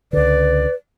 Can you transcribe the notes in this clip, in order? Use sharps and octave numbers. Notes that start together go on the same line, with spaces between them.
C#2 D3 B4 D5